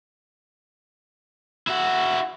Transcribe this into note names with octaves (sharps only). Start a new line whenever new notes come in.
E4 F#4